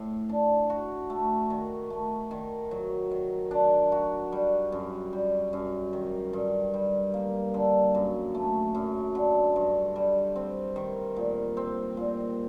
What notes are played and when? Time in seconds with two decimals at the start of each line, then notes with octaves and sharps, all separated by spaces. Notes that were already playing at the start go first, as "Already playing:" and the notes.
Already playing: A2
0.29 D4
0.70 F#4
1.10 A3
1.50 D#3
1.90 A3
2.31 D#3
2.71 F#3
3.11 D#3
3.51 D4
3.92 F#4
4.32 G3
4.72 F#2
5.13 G3
5.53 F#2
5.93 D#3
6.33 G2
6.74 G3
7.14 A#3
7.54 D3
7.95 F#2
8.35 A3
8.75 F#2
9.15 D3
9.56 G2
9.96 G3
10.36 C4
10.76 D#3
11.16 A#2
11.57 C4
11.97 A#2